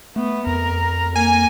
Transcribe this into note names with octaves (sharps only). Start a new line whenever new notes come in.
A3 B3
F2 A#4
A#3 G#5